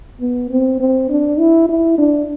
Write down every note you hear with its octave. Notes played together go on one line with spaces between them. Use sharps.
B3
C4
C4
D4
E4
E4
D4